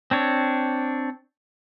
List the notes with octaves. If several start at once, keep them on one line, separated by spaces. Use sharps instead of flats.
C4 D4 C#5